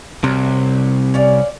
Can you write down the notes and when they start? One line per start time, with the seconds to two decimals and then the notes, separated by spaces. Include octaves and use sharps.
0.24 C2 C3 F#3
1.14 C#4 D5 F5